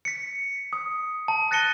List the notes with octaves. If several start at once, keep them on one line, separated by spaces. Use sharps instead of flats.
B6 C#7
D#6
A5
F#6 A6 A#6 C#7 D#7 G7